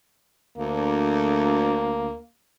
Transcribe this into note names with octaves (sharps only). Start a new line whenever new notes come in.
D2 A#3